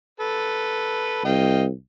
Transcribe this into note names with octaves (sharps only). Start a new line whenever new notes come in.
A4 B4
C2 D#5 F5 G5